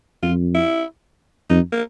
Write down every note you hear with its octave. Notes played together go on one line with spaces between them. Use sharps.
F2 F4
E4
F2 D#4
A#3